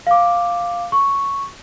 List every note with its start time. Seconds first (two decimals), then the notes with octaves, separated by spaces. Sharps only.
0.07 F5 D6
0.92 C#6